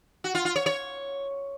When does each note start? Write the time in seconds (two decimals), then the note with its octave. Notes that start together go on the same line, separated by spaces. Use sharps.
0.24 F#4
0.35 F4
0.45 F4
0.56 C#5
0.66 C#5